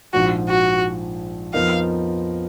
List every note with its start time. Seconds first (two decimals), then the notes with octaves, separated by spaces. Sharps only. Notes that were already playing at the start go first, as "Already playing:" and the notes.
0.13 A#1 G#2 F3 F#4
0.49 F#4
1.54 F2 F3 B3 D#4 A#4 F5